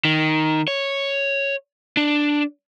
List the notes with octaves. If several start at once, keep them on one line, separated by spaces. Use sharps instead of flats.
D#3
C#5
D4